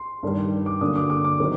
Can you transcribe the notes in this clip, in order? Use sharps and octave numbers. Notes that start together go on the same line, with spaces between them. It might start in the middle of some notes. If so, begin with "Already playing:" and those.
Already playing: C6
G2 D#3 G3
D6
D3 F#3 A#3 D4 D#6
D6
D6
D6
D#3 F#3 C4 D#4